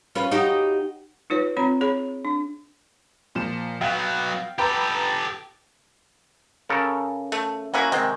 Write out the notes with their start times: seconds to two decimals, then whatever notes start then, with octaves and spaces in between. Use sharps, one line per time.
0.15 C#4 F4 B4
0.31 D#4 F#4 G4
1.30 D#4 F4 B4 C#5
1.57 C4 F4 C#5 A#5 B5
1.81 G#4 C#5 B5
2.25 D4
3.35 A#2 F3 E7
3.81 F#3 B3 F5 G5
4.58 G4 A4 B4 G5 A#5
6.69 C#3 A4 A#4
7.32 A3
7.74 F#3 A#3 C#4 E4 F#4
7.92 C3 D#3 G#3 C4 G5